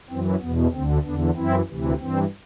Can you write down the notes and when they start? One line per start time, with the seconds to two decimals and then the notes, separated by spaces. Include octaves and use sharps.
0.10 F#2 E3 C4
0.42 E2 B2 B3
0.73 D2 D3 C4
1.05 E2 D3 B3 D4
1.36 F#2 E3 C4 E4
1.68 D2 C3 E3
2.00 G2 E3 C4